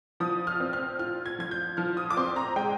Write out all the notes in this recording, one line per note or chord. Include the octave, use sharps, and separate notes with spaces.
F3 D#6
F6
C4
F6
F4 F6
G#6
F3 G#6
G6
F3 F6
D#6
D6
C4 C6
A#5
G#3 G5